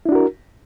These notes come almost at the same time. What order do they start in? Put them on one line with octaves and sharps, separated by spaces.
E4 D4 F#4 A#4